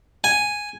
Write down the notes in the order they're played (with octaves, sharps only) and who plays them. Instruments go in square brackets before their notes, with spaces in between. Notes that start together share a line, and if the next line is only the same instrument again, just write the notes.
[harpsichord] G#5